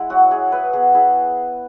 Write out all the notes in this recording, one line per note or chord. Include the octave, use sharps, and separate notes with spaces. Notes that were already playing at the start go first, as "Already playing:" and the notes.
Already playing: G#3 E4 F#5 G#5
F#3 F#4
F#3 G#4
E4 B4
B3 G#4
E4 G#4